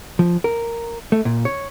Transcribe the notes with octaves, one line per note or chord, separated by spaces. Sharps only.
F3
A#4
A3
A#2
C#5